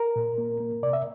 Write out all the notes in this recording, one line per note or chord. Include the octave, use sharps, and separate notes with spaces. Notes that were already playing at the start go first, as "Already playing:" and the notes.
Already playing: A#4
A#2
A#3
A#3
C3 D5
E5